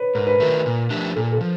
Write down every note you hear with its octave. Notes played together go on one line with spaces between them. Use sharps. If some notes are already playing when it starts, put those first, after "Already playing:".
Already playing: B4 C#5
G#2 A#4
B4
D#3 F#3 A3 A#4
A#2
F3 A3 D4 G4
A#2 A4
A4
F3